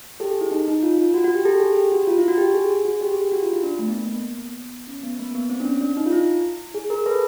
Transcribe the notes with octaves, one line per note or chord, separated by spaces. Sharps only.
G4 A4
G#4
E4
D#4
D#4
F4
F4
F#4
F#4
G4
G4 A4
G#4
G4
F#4
F4
E4
F#4
G4
G#4
G#4
F#4
G4
G#4
G4
F#4
F4
E4
D4
A3
B3
A#3
A#3
B3
C#4
B3
A#3
B3
C4
D4
C#4
D4
D#4
F4
E4
G#4
G#4 A#4
A4 B4